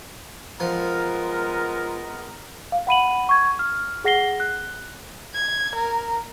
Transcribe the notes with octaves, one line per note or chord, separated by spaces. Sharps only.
F3 G#3 B3 A#4
F5
F#5 B5 D#7 F#7
C#6 G#6
F6
G#4 F#5 A#6 C7 G7
F#6
G#6
A#4